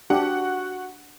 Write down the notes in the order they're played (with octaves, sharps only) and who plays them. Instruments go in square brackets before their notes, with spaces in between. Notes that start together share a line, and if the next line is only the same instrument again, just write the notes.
[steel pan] D4 G4 [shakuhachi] F#4 [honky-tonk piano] F#5